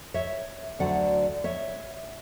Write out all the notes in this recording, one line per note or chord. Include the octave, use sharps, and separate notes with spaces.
C#5 E5
D2 D3 F#3 D5 F#5
C#5 E5